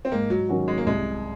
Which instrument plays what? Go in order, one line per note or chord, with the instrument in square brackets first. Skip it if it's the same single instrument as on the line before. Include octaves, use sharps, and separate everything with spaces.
[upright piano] C4
[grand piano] G#2 [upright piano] A#3
[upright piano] F#3
[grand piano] D#3 F#3 C#4 F#4
[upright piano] G#3
A#3
[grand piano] C2 [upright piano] G#3